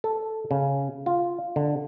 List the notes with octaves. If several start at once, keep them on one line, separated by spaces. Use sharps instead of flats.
A4
C#3
F4
D3